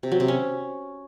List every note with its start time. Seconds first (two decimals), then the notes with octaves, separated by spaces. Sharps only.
0.03 C3
0.12 F#3
0.20 C3
0.28 C#4